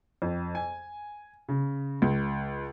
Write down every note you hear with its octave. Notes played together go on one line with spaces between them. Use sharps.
F2
G#5
C#3
C#2